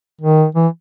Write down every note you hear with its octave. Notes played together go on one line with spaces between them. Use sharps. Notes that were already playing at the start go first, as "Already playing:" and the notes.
D#3
E3